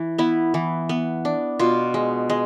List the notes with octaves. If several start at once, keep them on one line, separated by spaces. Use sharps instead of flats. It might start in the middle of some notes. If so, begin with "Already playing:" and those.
Already playing: E3
B3 E4
E3
B3
D4
B2 F4
G#3
G#3